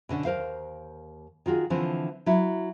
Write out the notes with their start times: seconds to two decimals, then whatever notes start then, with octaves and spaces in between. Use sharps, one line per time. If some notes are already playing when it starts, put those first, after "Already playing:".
0.09 B2 D3 C#4 D4
0.25 D#2 A#4 C5 F5
1.46 D#3 F4 F#4 G#4
1.70 D3 E3 F3 C4
2.26 F#3 E4